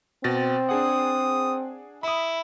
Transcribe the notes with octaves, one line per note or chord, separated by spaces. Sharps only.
B2 C4 A6 A#6
D4 G#4 F#5 D#6
E4 B5 D#6